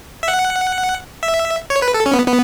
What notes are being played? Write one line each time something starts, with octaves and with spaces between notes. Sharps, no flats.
E5
F#5
E5
C#5
B4
A4
C#4
B3
B3